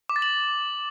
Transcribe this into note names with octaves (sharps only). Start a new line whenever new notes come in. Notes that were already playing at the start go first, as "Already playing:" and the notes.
D6
A6
F#7